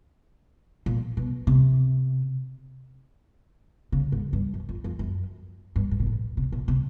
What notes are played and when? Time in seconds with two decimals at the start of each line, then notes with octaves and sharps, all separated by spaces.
0.86 A#2
1.17 B2
1.47 C3
3.92 C#3
4.12 G#2
4.33 G2
4.54 F#2
4.69 F2
4.84 F2
4.99 F#2
5.76 G2
5.91 G#2
6.00 A#2
6.06 A2
6.37 C3
6.52 A#2
6.68 C3